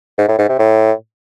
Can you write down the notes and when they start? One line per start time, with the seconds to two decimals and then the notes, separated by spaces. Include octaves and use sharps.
0.18 G#2
0.28 A2
0.39 G#2
0.49 C3
0.59 A2